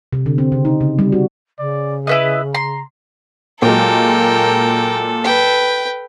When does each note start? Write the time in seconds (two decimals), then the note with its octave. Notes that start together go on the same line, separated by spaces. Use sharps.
0.13 C3
0.26 D3
0.38 C4
0.52 C#3
0.65 D#4
0.81 C#3
0.99 G3
1.12 F#4
1.59 C#3 D5
2.07 E4 B4 D#5 E5
2.55 A#5 C6
3.62 A#2 F#3 G#3 A4 A#4 G5
5.24 B4 G5